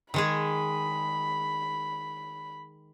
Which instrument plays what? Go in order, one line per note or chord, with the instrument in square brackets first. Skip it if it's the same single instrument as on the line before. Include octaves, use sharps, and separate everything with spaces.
[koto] D#3 G#3 G#4 [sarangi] B5